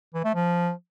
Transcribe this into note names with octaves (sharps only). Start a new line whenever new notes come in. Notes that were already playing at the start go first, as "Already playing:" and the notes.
E3
A3
F3